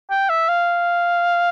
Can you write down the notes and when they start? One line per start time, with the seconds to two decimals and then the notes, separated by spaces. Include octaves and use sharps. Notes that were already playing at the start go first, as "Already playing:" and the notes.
0.11 G5
0.30 E5
0.49 F5